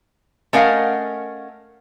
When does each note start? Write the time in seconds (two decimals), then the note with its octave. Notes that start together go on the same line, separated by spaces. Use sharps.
0.53 A3 C#4 A#4 D#5 F5 F#5